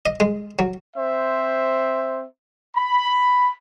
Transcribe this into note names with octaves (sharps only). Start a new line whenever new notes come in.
D#5
G#3
F#3
C4 C5 E5
B5